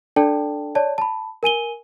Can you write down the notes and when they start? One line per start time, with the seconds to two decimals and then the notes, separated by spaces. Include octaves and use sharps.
0.16 D4 A4 D5 G5 A5
0.75 C#5 D5 A5
0.98 A5 B5
1.43 A#4 G#5 D#7 G7